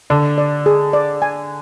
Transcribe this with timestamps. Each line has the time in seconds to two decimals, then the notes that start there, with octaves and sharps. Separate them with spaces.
0.10 D3 D5
0.38 D5
0.66 G#4
0.93 D5
1.22 G#5